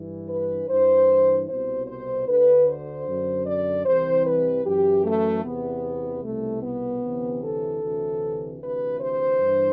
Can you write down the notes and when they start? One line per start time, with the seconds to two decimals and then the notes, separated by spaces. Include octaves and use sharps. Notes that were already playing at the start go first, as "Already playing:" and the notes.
Already playing: G2 E3
0.29 B4
0.68 G2 E3 C5
1.47 C2 B2 C5
1.87 C5
2.27 D2 D3 B4
2.66 C5
3.06 F#2 D3
3.45 D5
3.85 C2 C3 E3 C5
4.25 B4
4.64 F#2 E3 G4
5.05 A3
5.44 E2 C3 E3 B3
6.23 C2 B2 A3
6.63 B3
7.03 D2 C3 E3
7.42 A4
7.81 D2 C3 E3
8.61 D2 C3 E3 B4
9.00 C5
9.40 G2 E3